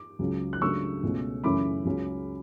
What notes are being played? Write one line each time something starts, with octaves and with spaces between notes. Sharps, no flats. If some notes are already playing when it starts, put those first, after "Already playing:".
Already playing: D6
C#2 C#3 F#3
F#6
C#2 C#3 F#3 A3 D4 C#6 E6
C#2 B2 A3 C#4
F#2 C#3 E3 A3 C#4 B5 D6
C#2 C#3 F#3 C#4